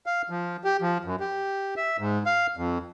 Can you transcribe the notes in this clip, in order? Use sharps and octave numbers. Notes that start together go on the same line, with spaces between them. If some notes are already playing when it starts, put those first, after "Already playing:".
F5
F3
G4
F3
F#2
G4
E5
G#2
F5
F2